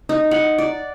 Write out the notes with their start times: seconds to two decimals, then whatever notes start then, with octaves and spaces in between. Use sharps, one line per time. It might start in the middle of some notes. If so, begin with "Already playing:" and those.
0.09 D#4
0.31 F#5
0.58 D5